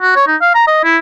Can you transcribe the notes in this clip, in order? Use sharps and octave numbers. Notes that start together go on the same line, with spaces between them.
F#4
C#5
D#4
F5
A#5
D#5
E4